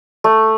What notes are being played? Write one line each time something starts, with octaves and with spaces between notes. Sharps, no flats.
A3